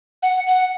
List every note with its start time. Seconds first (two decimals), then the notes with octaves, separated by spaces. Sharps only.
0.23 F#5
0.47 F#5